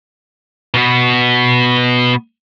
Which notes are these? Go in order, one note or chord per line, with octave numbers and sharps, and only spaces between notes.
B2 B3